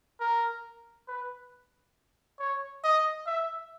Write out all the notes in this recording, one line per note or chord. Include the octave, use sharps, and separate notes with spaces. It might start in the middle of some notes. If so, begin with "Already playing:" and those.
A#4
B4
C#5
D#5
E5